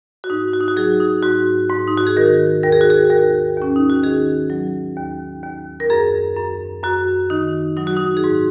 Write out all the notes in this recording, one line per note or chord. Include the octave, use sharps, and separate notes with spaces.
F#4
G#2 D#4
F#4
D#4
F#4
F#3 G#4
D#4
G#2 F#4
G#2
D#4
F#4
G#4
D#3 A#4
D#2 A#4
G#4
F#4
G#4
D#2 A#4
D#2 C#4
D#4
F#4
D#3 G#4
F#3
D#2
D#2
A#4
F#2 G#4
F#2
F#2 F#4
D#3 D#4
F#3 D#4
F#4
D#4
G#4
G#2 F#4